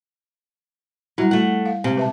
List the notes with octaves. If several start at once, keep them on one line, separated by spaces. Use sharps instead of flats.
F#3 G3 E4
A3 F#5
F5
C3 G#3 C4
B4 E5 A5